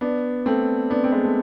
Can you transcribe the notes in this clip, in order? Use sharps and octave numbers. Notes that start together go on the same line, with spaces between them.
B3 D4
A3 C4
B3 D4
C4
G#3 B3
A3